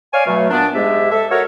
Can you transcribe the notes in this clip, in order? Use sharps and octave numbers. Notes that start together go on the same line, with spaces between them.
C#5 D5 F5 G#5
B2 F#3 A3
A#2 B3 D4
G#2 G#3 G4 E5
A4 E5
F#4 A4 A#4 C#5